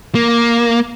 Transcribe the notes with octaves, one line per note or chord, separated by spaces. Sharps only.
A#3